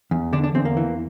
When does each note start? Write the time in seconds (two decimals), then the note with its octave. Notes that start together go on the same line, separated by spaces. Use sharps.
0.11 E2
0.33 D3 D4
0.44 D4
0.54 E2 C4
0.65 A#3
0.77 E3